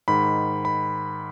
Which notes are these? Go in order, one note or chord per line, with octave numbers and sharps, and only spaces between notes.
G#2 D#3 B5
B5